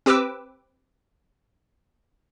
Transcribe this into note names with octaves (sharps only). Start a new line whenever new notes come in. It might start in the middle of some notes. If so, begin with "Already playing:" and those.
C4 G4 B4 D6 E6